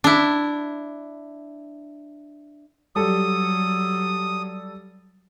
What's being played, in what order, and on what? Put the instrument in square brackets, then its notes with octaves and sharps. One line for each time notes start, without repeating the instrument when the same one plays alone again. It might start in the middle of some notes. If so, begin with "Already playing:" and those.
[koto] D4 E4
[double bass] F#3 [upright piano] G3 A4 [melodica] D#6